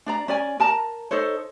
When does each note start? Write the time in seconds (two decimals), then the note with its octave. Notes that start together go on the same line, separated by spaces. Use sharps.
0.06 D4 D5 A#5
0.28 C#4 D5 G#5
0.60 A#4 A5 A#5
1.11 D#4 A4 C5 C#5